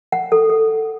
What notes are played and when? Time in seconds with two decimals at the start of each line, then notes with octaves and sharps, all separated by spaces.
0.12 F#5
0.32 A4
0.50 A4